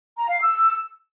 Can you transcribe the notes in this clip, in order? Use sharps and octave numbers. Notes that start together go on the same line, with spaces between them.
A#5
F5
E6